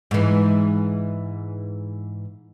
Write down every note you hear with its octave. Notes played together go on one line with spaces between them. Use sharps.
G#2 E3